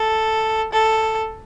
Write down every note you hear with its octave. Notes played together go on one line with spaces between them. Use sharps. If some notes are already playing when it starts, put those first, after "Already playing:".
Already playing: A4
A4